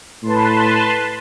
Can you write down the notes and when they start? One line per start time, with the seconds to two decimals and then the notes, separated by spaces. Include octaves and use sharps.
0.23 A2 B4 A5 C6